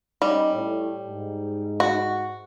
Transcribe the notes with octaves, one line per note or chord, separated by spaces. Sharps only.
G3 C#4 D#4 D#5
A2
G#2
F#4